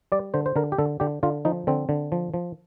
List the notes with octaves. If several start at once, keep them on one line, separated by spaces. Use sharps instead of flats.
G3 D5
D3 C5
C5
D3 A#4
G4
D3 A4
D3 G4
D3 F4
F3 D#4
D3 C4
D3
F3
F3